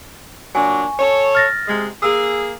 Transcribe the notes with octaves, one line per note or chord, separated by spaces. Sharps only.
A#2 F#3 D4 G#5 C#6
A4 C#5
F6 A6 A#6
C3 G#3
A#3 G#4 E6